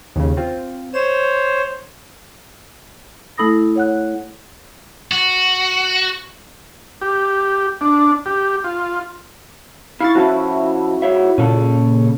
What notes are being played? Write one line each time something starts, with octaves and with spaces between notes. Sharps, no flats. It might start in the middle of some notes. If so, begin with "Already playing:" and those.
D#2 C#3
C4 F4
C5 C#5 E7
A3 E4 A4 B5 D#6 A#6
C#5 F#5 F#6
F#4
G4
D4
G4
F4
E4 F5 C#6 A6
F3 C#4 E4 F#4 A5
G#2 C#5 E5
A#2 C#3 C#4 A4